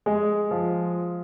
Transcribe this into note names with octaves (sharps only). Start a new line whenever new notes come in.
G#3
F3